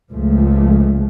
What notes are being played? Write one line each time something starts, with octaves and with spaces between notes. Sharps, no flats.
C#2 F3 G#3 A3